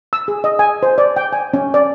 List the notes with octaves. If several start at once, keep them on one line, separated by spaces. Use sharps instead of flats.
E6
G#4
D#5
G#5
C5
D5
G5
G#5
C#4
D5